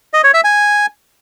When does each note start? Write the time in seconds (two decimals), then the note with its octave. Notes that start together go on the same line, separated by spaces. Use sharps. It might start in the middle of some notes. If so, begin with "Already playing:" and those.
0.14 D#5
0.24 C#5
0.34 E5
0.44 G#5